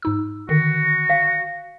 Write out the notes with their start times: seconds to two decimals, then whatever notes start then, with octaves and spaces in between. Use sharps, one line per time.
0.02 G#2 D#4 E6
0.49 D3 D#3 F#4
1.10 F5